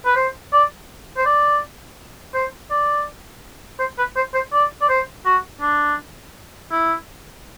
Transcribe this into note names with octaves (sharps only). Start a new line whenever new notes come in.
B4
C5
D5
C5
D5
C5
D5
C5
B4
C5
C5
D5
D5
C5
F#4
D4
E4